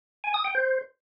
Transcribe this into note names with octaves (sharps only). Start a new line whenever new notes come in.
G#5
D#6
G5
C5